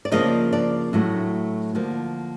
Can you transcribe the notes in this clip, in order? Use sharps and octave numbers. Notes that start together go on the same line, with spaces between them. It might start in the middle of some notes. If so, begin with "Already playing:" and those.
D5
C#3 F3 A#3 D4 D#4 D#5
D4 D5
A2 F#3 A3
D3 F3 A#3